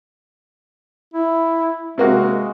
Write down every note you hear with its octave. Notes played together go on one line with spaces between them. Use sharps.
E4
C3 G#3 A#3 F#4